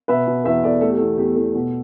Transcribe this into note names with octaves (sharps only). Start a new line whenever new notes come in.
B2 B4 E5
B2
E2 B4 E5
E2 A4 D5
A3 A4
G4
E2 A4
E2 G4
E2 A4
B2